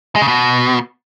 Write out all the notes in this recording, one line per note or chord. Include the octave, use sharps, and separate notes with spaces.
G#3
C#3
B2